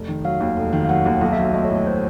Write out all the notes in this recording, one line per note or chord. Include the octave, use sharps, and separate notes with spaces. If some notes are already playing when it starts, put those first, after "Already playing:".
Already playing: F1
D#3
F#3 F5
D#2
F1
D#3
F5
F#3 F#5
D#2
B1 F5
E5
F#3
E5
A3 D#5
C#5
A2
C#5
C5